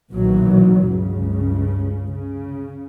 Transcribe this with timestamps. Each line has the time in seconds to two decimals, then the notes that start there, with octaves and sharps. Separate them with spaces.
0.12 B1 A#2 D#3 E3 F#3
0.82 C#2 G2 C#3
2.14 C#3